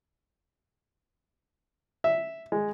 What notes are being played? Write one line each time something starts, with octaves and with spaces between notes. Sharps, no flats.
E5
G#3